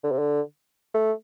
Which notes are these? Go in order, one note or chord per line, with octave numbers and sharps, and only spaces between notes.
D3
C3
D3
A3